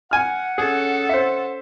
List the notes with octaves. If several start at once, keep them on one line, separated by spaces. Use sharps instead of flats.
F#5 G#5 F6
C#4 G#4 A4
C5 E5